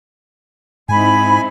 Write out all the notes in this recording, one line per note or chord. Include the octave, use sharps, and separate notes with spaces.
G#2 C4 D#4 E4 G#5 B5